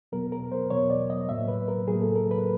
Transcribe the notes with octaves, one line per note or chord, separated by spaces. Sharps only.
E2 B2 F#3 B3 A#4
A#4
C5
E2 B2 F#3 B3 C#5
D5
D#5
A2 F#3 A#3 E5
B4
A#4
A2 F#3 A#3 G#4
A4
A#4
B4